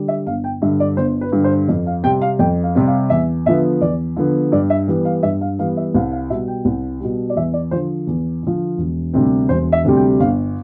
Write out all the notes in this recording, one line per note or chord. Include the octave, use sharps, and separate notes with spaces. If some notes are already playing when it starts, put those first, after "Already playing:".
Already playing: D3 G3
E5
G1 F5
G5
G2 D3 E5
D5
G1 C5
B4
G2 D3
C5
F2
F5
C3 G3 C4 G5
F5
F2 G5
F5
C3 G3 C4
F5
E2 E5
D3 F3 B3 E5
E2 D5
D3 F3 B3
G2 D5
E5
E3 G3 B3
F5
G2 E5
F5
E3 G3 B3 F5
E5
C2 F5
F5
B2 G3 E5
G5
C2
B2 G3
D5
E2 E5
D5
D3 F3 C5
E2
D3 F3
E1
D2 C3 G3 C4
E1 C5
E5
D2 C3 G3 C4
G5
G1 F5